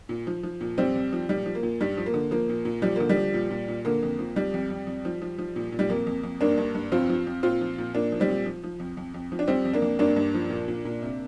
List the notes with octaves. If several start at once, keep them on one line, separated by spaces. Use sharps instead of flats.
A#2
F3
F3
A#2
F2 G3 C4
F2
F3
A#2 G3
F3
A#3
A#2
G2 G3
F3
A#3
D3
F3 A#3
A#2
A#2
F3 G3
D3 A#3
G3
F3
A#2
A#2
A#2
D3 A#3
F2
F3
F2 G3
F2
F2
F2
F3
F3
F3
A#2
A#2
G3
F2 A#3
F2
F2
G2 A#3 D4
G2
G2
F2 C4 F4
F3
F2
A#2 C4 F4
F3
A#2
A#2 A#3 D4
F3
G3 C4
A#2
F3
F3
F2
F2
F2
F3
D4
F2 G3 C4
F2
A#3 D4
F2
G2 A#3 D4
G2
F3
A#2
A#2
A#2
C3